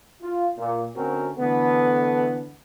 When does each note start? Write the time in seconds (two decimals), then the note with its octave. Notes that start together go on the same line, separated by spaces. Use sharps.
0.21 F4
0.58 A#2
0.96 D2 C4 C#4 F#4 A#4
1.39 D3 E3 A3 B3